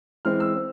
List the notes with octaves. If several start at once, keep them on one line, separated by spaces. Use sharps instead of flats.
E3 G#3 C4 F6
E6
C4